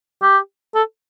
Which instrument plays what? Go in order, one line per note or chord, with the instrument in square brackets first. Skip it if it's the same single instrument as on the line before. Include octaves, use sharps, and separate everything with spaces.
[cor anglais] G4
A4